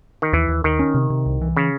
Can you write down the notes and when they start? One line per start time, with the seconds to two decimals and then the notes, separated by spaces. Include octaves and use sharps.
0.22 D#3
0.33 D#2 E3
0.48 D#2
0.64 D#2 D#3
0.79 C#4
0.94 C3
1.10 C3
1.26 C2
1.41 E3
1.57 C#3